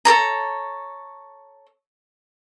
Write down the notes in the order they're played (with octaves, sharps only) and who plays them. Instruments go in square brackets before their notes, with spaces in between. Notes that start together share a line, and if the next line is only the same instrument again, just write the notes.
[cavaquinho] A4 A#4 C#5 A#5